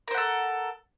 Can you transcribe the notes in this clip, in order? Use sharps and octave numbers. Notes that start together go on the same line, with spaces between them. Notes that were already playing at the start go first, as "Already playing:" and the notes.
A4 A#4 C5 F#5